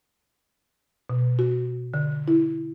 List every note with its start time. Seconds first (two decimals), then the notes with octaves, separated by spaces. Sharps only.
1.10 B2
1.39 F#4
1.94 D3
2.28 E4